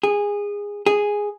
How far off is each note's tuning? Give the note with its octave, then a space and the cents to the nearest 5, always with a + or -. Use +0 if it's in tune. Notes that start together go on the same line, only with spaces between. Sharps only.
G#4 -20
G#4 -5